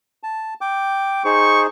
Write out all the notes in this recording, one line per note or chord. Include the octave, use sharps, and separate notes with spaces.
A5
G5 D6
D#4 G#4 C5 C#6